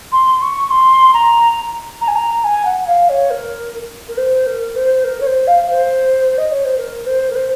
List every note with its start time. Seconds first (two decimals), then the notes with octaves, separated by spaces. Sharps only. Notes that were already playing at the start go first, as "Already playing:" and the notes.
0.12 C6
0.41 C#6
0.70 C6
1.13 A#5
2.01 A#5
2.07 G#5
2.15 A#5
2.44 G#5
2.65 F#5
2.87 F5
3.09 C#5
3.30 A#4
4.08 A#4
4.17 C5
4.46 A#4
4.75 C5
5.04 A#4
5.20 C#5
5.26 C5
5.47 F5
5.69 C5
6.38 D#5
6.51 C#5
6.64 C5
6.77 A#4
7.06 C5
7.30 A#4
7.35 C5